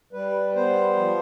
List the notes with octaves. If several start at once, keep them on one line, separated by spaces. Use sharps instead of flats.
G3 B4
B3 C5
F3